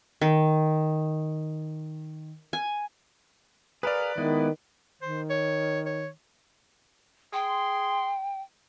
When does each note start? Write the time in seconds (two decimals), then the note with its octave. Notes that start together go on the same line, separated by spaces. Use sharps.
0.21 D#3
2.53 G#5
3.83 G#4 A#4 B4 D5 F5
4.18 D#3 G#3 B3 E4
5.02 D#3 C5
5.30 C#5
5.86 C#5
7.33 G#4 G5 C6